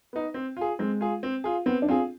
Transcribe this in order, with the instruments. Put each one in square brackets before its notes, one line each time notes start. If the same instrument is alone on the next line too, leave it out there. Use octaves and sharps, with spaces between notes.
[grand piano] B3 D#4
C4
F4 G#4
[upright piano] G#3 [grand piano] C4
[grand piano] F4 G#4
C4
F4 G#4
[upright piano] B3 [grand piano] C4
[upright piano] D4
[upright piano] C4 [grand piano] F4 G#4